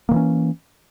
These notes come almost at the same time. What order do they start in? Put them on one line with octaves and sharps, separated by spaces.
A#3 D#3 E3 C#4